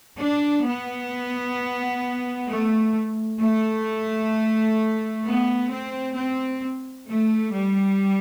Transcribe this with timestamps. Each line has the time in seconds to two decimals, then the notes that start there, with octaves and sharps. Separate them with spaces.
0.18 D4
0.65 B3
2.47 A3
3.40 A3
5.24 B3
5.69 C4
6.15 C4
7.06 A3
7.53 G3